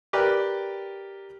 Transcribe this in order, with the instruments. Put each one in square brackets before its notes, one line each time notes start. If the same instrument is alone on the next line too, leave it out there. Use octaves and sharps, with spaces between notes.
[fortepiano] G4 A#4 B4 D5 G5